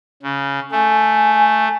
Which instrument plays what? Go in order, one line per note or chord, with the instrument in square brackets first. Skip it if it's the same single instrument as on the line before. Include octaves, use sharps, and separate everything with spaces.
[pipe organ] C#3
[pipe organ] A3 [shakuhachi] G#5